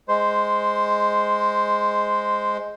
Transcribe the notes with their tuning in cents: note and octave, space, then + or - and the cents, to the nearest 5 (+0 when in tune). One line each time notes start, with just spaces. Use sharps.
G#3 +0 C5 +0